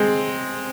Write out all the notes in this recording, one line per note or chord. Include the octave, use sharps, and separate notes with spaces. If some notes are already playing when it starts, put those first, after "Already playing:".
Already playing: G#3 C4